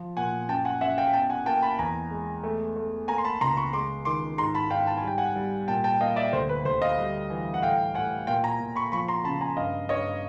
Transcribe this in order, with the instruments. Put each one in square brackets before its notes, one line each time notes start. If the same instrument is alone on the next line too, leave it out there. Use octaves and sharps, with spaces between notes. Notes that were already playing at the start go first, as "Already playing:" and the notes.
Already playing: [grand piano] F3
A#2 F#5 G#5
F#2 G5 A5
F#5 G#5
F#2 E5 F#5
F5 G5
B2 G5 A5
F#5 G#5
A#3 G5 A5
A5 B5
E2 G#5 A#5
G#3
A3
A3
A#3 G#5 A#5
C6
A5 B5
C#2 A#5 C6
B5 C#6
G#3 C6 D6
D#3 C6 D6
G#2 A#5 C6
A5 B5
G#2 F5 G5
A5
G#5
G3 G5
F#5 G#5
G3
A#2 G5 A5
G5 A5
A#3 D#5 F5
D5 E5
D2 C5
B4
D2 C5
D#5 F5
G3
E3
F#5
A2 F5 G5
A2 F#5 G#5
A#2 F5 G5
G#5 A#5
A#2
B5 C#6
F3 B5 C#6
A#5 C6
C#3 A5 B5
G#5 A#5
G2 D#5 F5
G2 C#5 D#5